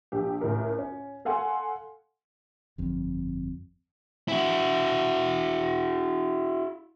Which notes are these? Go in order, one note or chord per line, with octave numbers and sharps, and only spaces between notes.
A#1 G4
C#2 A2 A#4
C#4
A4 F5 F#5 G#5 C6
G1 F2
E4 F#4